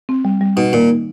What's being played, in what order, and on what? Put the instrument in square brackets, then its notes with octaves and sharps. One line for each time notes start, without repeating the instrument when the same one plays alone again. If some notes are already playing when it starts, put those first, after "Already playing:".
[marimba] C4
G3
G3
[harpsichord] B2 [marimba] D#4
[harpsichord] A#2 [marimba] D#3
[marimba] D#4